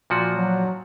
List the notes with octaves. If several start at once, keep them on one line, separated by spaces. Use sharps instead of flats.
A#2 F3 F#4
F#3